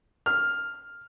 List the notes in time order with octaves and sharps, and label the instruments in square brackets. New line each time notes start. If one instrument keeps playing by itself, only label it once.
[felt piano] F6